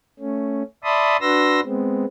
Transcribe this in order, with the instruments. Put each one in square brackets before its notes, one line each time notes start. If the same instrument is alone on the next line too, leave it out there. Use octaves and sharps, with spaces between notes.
[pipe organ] A3 C#4
D5 E5 A5 B5 C6 D#6
D4 F#4 B4 C6 E6 A#6
G#3 B3 C4